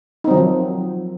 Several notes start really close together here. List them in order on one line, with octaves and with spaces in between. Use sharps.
D#4 C4 F#3 D#3 F3